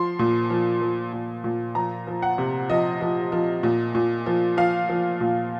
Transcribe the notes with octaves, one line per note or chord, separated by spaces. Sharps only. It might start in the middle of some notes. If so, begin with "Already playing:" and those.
Already playing: F3 C6
A#2
F3
F3
A#2
A#2
F3 A#5
F3
F#5
C3
F3 D#5
F3
F3
A#2
A#2
F3
F3 F5
F3
A#2